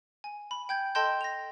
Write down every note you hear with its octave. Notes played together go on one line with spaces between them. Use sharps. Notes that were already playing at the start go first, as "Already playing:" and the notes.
G#5
B5
G5 G6 G#6
A4 D#5 G5 A5 C6 G6
A#6 F7